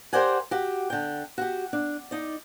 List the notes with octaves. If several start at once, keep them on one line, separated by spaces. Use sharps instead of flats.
G4 A#4 C5 D5 F#5 G#5
F#4 G4
D3 G5
F#4 G4
D4
D#4 D5